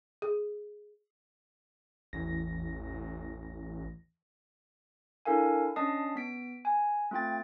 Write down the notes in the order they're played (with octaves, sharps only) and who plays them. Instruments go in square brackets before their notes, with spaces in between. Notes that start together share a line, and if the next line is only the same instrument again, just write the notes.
[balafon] G#4
[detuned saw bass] A1 [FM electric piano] E2 E3 A#6
[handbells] D4 E4 A4 A#4 F5 G#5
C#4 D4 D#5 A5 D#6 C7
B3 B6 D7
G#5
A3 C4 F4 G5 A6